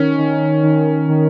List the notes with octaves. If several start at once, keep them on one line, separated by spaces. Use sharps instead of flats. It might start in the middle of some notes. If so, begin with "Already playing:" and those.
Already playing: D#3 C#4
D#3
D#3
D#3